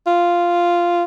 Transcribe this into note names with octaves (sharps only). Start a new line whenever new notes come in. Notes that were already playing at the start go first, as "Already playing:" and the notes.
F4